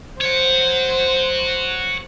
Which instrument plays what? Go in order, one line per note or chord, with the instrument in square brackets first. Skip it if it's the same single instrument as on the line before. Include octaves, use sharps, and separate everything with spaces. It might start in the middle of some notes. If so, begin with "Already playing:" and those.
[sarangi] C5 [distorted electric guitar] C#5 F#5